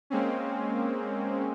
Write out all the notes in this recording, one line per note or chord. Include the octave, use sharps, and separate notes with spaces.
G#3 A#3 C4 C#4